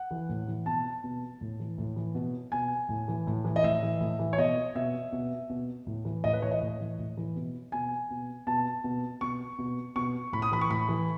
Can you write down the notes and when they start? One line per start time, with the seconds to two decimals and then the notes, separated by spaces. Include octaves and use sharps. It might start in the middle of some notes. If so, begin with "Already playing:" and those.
Already playing: F#5
0.11 E3
0.29 A2
0.48 E3
0.66 B2 A5
1.04 B2
1.41 A2
1.60 E3
1.78 A2
1.96 E3
2.15 B2
2.52 B2 G#5
2.89 A2
3.08 E3
3.27 A2
3.44 E3
3.56 D#5
3.64 A2 E5
3.83 E3
4.01 A2
4.19 E3
4.33 C#5
4.38 B2 D#5
4.75 B2 E5
5.12 B2
5.50 B2
5.87 A2
6.05 E3
6.24 A2 D#5
6.33 B4
6.42 E3 C#5
6.51 D#5
6.62 A2
6.80 E3
6.99 A2
7.17 E3
7.36 B2
7.72 B2 G#5
8.10 B2
8.47 B2 A5
8.84 B2
9.21 B2 C#6
9.58 B2
9.96 B2 C#6
10.33 A2 B5
10.42 D#6
10.52 E3 B5
10.61 C#6
10.70 A2 B5
10.89 E3